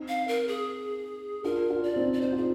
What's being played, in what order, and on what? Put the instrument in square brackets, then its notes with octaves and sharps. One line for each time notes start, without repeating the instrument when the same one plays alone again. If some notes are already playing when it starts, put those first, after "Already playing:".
Already playing: [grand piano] C4 D#4
[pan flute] F5
A#4
G#4
[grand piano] D4 F4 [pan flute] A#4
[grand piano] D4 F4
[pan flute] D5
[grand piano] C4 D#4
[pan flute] D5
[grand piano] D#4 [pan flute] C5
[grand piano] F4 [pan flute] G#4